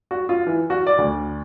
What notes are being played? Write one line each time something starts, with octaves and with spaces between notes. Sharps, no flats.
F#4
F4
E3
F#4
D5
D2